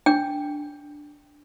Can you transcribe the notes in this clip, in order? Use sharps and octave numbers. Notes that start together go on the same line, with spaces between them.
D4 G5